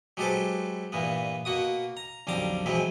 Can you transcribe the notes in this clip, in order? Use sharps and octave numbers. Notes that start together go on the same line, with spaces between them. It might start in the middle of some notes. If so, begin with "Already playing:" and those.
F#3 G#3 G4 A4 B4 C5
G2 A#2 E3 B3
B2 A#3 F#4 D#6
A#5
B1 F2 D3 G3 A#5 D6
B2 E3 F#3 G#3 C4